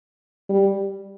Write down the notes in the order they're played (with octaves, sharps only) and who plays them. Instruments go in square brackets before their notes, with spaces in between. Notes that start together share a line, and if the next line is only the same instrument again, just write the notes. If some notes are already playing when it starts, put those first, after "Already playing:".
[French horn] G3